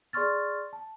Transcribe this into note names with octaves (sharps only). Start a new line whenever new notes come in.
G#4 D5 C6 C#6 F6 A6
A5